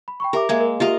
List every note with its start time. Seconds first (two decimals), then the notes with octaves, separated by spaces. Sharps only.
0.08 B5
0.20 G5 B5 C#6
0.33 G4 A#4 E5 D6
0.49 G#3 A#3 E5 G#6
0.60 A#4
0.80 F4 G4 A#4 D#5 E5 F7